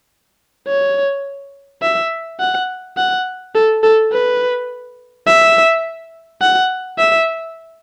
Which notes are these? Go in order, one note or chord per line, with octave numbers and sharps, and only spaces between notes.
C#5
E5
F#5
F#5
A4
A4
B4
E5
F#5
E5